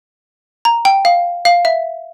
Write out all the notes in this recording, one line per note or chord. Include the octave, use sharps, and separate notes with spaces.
A#5
G5
F5
F5
E5